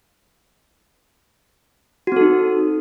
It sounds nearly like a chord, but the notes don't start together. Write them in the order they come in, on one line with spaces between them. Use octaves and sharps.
F#4 C4 A4 D#4